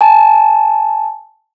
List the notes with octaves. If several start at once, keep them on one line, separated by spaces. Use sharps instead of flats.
G#5 A5